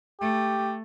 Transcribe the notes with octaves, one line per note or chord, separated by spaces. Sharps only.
A3 G4